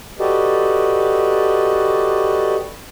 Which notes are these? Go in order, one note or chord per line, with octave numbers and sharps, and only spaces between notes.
F#4 G4 A4 B4 D5 D#5